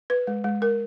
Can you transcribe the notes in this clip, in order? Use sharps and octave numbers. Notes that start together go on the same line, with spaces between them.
B4
G#3
G#3
A#4